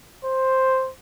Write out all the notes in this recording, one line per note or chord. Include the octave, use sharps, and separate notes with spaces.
C5